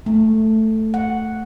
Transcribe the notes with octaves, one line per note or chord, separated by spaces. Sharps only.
A3
F#5